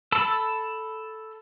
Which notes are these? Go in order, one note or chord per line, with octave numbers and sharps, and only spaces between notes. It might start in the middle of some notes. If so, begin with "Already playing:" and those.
A4 A5 B5 E6